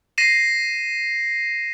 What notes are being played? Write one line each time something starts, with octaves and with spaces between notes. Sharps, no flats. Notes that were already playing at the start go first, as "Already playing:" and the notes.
A#6 C7 D#7 E7